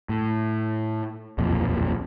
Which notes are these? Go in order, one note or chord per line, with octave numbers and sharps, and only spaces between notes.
A2
D#1 B1 F2 A#2